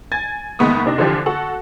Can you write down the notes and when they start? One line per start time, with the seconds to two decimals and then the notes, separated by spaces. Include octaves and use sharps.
0.12 G#5 G#6 A6
0.59 F#1 D#2 G#3 B3 C#6 D#6
0.86 C3 D4 D#4 A#6
0.98 D3 E3 F3 D4 F4 G4
1.26 F#4 A4 F#5 C#6